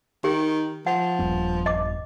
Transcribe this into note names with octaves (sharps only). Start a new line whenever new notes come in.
D#3 G4
F3 F#5
D#1 G2 B3
D#5 D6